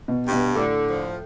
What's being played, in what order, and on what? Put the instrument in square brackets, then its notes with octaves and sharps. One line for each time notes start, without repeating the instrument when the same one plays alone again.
[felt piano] B2
[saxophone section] G2
[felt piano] B2
[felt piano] A2 [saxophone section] D3
[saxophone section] F3